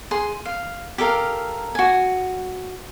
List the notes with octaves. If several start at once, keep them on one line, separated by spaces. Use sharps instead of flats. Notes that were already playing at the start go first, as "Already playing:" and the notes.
G#4 C6
F5
G4 A4 A#4 F5
F#4 G#5